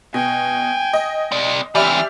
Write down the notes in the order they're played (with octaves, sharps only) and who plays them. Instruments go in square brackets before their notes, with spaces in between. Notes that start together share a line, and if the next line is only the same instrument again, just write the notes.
[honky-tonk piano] B2 [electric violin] G5 G#5
[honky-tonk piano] D#5
[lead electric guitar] C4 D5
[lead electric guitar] E3 C4 [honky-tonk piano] G4 D5 E5 [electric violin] F6